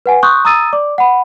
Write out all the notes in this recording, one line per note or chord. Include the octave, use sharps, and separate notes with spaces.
B4 F#5 G#5
C6 C#6 D#6 F#6 G6
A#5 D#6 E6 A6 D#7
D5 D6
F#5 B5